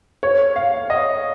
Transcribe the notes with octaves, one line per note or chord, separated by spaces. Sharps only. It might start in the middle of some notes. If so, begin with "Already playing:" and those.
C#5
F5
D#5